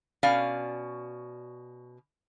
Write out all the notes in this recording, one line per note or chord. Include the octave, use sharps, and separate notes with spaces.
B2 C#4 D5 F5